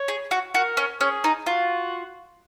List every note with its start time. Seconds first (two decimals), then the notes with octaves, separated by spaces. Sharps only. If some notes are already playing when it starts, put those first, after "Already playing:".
Already playing: C#5
0.08 G#4
0.31 F#4
0.54 F#4 A#4
0.77 C#4
1.00 C#4 G#4
1.24 D#4
1.46 F4 F#4